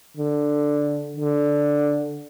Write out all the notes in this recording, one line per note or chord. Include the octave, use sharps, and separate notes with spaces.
D3
D3